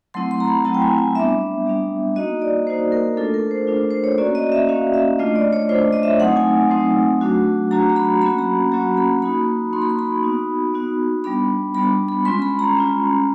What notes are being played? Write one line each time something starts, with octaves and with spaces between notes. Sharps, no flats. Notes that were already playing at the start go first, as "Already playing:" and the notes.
F#3 A3 C4 E4 C6
C6
A#5
B5
F#3 A3 C4 E4 A5
G5
G#5
G#5
G3 B3 D4 E5
G3 B3 D4
A#3 D#4 F#4 D#5
D5
A#3 D#4 F#4 C5
A#4
A3 D4 F4 A4
A#4
C5
A3 D4 F4
C5
C#5
A#3 C#4 F#4 D5
D#5
E5
A#3 C#4 F#4 F5
E5
A3 D4 F4 D#5
D5
C#5
A3 D4 F4 C5
D#5
E5
F#3 A3 C4 D#4 F#5
G#5
F#3 A3 C4 D#4
F#3 A3 D4 F#4
F#3 A3 D4 F#4 A#5
A#5
B5
F#3 A#3 C#4 F#4 B5
A#5
F#3 A#3 C#4 F#4 A#5
B5
A#3 D#4 F#4 B5
A#3 D#4 F#4 C6
B5
C6
B5
B3 D#4 F#4
B3 D#4 F#4
G3 B3 D4 B5
G3 B3 D4 B5
B5
G#3 C#4 F4 C6
B5
A#5
G#3 C#4 F4